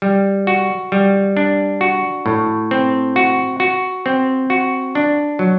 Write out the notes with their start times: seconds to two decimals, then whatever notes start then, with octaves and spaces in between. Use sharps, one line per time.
0.02 G3
0.47 F#4
0.92 G3
1.37 D4
1.81 F#4
2.26 A2
2.71 C4
3.16 F#4
3.60 F#4
4.06 C4
4.50 F#4
4.95 D4
5.39 F#3